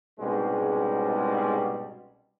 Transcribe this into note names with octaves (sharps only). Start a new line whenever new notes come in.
C2 G#2 B2 G3 G#3 C#4